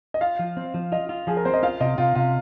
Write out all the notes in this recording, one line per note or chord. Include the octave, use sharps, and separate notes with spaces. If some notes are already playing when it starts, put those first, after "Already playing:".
D#5
F4 F5
F3
C4
F3
F4 D#5
F4
F3 G#4
A#4
C4 C5
D#5
F4 F5
C3 D#5
C3 F4
C3 F4